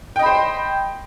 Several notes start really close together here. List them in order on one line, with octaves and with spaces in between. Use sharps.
G5 D#5 B5 C5